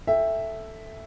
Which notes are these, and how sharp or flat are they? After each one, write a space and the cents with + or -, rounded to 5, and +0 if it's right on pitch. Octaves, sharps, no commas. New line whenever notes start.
A4 +0 E5 +0 G5 +20